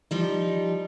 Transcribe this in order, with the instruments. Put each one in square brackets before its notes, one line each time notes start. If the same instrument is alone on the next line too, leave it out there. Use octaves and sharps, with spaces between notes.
[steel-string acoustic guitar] F3 G3 D#4